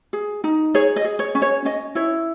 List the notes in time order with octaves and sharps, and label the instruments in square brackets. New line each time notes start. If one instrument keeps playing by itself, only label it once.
[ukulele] G#4
D#4
G#4 C#5
D#5
G#4
C#5
C#4
C#5
C#4 D#5
E4 C#5